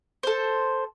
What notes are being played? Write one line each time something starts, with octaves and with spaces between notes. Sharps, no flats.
A4 C5